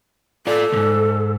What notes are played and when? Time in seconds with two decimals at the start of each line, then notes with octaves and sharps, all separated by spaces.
0.47 F4 A4 D5
0.72 C#2 G#2